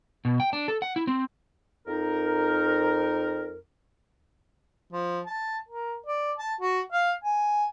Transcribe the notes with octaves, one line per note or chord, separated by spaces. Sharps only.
B2
G5
D4
A4
F#5
E4
C4
F2 D#4 A#4
F3
A5
A#4
D5
A5
F#4
F5
G#5